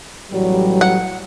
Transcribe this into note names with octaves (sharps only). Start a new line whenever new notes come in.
A1 F#3 G3
F#5